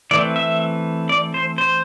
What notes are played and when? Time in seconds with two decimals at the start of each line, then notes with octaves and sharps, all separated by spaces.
0.11 E3 A3 C4 D5
0.36 E5
1.09 D5
1.34 C5
1.58 C5